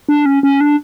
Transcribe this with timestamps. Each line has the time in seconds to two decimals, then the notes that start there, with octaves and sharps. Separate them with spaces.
0.09 D4
0.26 C#4
0.43 C#4
0.61 D4